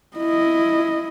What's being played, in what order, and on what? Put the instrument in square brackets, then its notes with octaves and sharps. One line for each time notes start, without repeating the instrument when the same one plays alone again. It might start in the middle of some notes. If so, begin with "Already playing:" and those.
[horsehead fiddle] E4 D#5